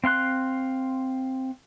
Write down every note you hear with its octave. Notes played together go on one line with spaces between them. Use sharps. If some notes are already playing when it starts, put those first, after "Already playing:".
C4 F5 C6 F#6